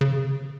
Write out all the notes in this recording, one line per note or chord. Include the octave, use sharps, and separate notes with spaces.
C#3